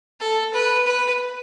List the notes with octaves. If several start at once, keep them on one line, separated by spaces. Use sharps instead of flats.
A4
B4
B4